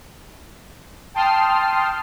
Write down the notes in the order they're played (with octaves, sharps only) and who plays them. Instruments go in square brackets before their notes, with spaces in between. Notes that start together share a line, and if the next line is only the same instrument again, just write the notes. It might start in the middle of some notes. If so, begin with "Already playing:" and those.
[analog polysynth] G5 A5 C6 D#6 F6 C7